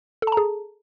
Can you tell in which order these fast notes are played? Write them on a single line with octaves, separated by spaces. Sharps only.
A4 A5 A#5 G#4